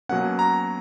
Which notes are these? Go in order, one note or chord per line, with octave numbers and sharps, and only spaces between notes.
B2 F#3 A#3 C#4 F#5
A#5